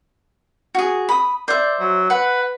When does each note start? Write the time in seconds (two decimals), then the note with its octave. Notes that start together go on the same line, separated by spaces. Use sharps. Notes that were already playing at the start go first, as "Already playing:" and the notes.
0.75 F#4 G#4
1.09 B5 D#6
1.48 C5 D5 E5
1.80 F#3
2.10 B4 F#5